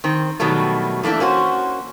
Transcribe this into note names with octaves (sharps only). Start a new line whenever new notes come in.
D#3 C4
B2 D#3 F#3 G3 A3
E3 A3 A#3 D4 E4
A#3 C#4 F#4 C5